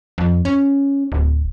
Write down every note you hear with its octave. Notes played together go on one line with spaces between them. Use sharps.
F2
C#4
D1